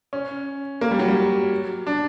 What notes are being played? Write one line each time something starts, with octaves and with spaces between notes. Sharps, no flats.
C#4
A#3
G3
F#3
G3
D4